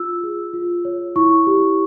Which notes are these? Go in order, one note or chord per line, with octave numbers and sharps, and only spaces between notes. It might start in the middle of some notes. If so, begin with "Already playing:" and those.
Already playing: F4 E6
G#4
F4
C#5
E4 C#6
G4